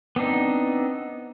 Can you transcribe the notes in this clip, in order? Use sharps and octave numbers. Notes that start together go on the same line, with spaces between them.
B3 C4 D4 D#4